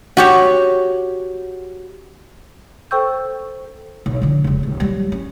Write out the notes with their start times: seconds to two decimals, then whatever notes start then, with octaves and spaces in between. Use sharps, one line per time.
0.17 F#4 G4 C#5
2.91 A4 C5 G5 C#6 E6 G6
4.06 B1
4.22 D3 F3
4.44 F1 C#2
4.63 D#1
4.80 F#3 G3
5.12 C#4